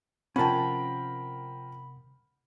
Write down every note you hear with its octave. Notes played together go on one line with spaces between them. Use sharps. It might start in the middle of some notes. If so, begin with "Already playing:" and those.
C3 F3 C#4 A#4 F#5 G5 A5 B5